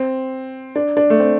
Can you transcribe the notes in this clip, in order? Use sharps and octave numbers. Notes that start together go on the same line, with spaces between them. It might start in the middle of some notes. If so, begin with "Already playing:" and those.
Already playing: C4
D4
D4
A3
C4